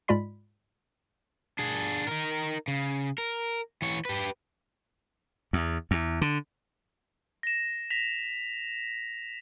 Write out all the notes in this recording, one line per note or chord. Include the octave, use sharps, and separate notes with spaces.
G#2 G#3 F4 D5 B5 B6
D4 G#4
D#4 A#4
C#3
A#4
E3 C#5
G4 B4
E2
E2
D3
A#6 E7
A#6 B6 F7